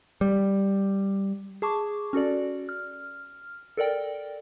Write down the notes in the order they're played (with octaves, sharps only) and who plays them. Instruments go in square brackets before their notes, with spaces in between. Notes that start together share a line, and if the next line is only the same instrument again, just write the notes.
[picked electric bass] G3
[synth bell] G#4 A5 C#6 D6
C#4 F#4 A4 D5
F6
A4 A#4 D5 G5